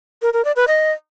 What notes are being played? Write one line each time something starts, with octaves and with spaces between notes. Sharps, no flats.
A#4
A#4
D5
B4
D#5